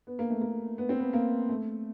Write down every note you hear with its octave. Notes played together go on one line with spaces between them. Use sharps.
B3
A#3
A3
A#3
B3
C4
B3
A#3
A3